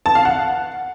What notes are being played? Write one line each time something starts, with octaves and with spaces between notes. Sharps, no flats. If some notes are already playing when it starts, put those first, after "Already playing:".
A5
F5
F#5